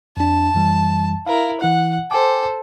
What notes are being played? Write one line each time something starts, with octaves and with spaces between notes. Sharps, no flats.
F2 D4 A5
F#2 E3 G3
E4 A#4 F5
E3 E4 F#5 F#6
A4 C5 G5 G#5 D6